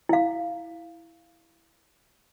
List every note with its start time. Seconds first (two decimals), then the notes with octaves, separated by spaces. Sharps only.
0.09 E4 F5